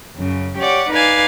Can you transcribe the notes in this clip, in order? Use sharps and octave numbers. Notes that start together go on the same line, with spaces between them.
F#2 C#3
G4 C#5 D5 F#5
D#4 B4 D5 F5 G#5